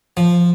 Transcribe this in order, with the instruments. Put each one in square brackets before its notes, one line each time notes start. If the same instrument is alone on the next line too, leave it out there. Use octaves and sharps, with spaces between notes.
[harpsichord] F3